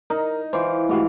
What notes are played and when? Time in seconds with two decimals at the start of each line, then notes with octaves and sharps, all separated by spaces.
0.10 D#4 A#4
0.53 E3 F4 C5 D6
0.89 G#2 E3 A3 F#4 G4 F5